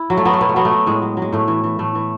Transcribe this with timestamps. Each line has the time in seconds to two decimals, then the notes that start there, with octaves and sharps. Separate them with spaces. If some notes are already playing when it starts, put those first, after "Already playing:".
Already playing: E4
0.10 F#3
0.17 A3
0.25 F#3 B3
0.33 A3
0.41 B2 B3
0.49 A3
0.56 F#3 B3
0.65 A3
0.72 F#3
0.86 A2 G#3
1.02 F#3
1.17 F#3
1.22 G#3
1.33 A2 A3
1.48 E3
1.64 E3
1.79 A2 A3
1.95 E3